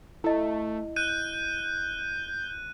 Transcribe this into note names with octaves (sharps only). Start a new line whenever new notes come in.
A3 E4 D#5
F#6 G6 D#7